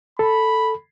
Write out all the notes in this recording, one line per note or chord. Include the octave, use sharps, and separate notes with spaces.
A4 B5